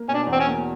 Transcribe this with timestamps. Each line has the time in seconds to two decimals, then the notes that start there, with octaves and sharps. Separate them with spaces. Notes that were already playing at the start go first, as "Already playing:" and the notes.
Already playing: A#3
0.08 B2 C#4
0.14 D4
0.27 E2
0.32 C4
0.40 C#4
0.46 A#3